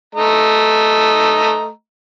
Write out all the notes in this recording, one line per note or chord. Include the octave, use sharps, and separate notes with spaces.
A3 D#5 A#5